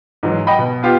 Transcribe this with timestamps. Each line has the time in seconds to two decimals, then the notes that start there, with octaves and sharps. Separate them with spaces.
0.23 G#2 E3 F#3
0.47 D#5 F#5 G5 B5
0.59 B2
0.83 B3 F4 G4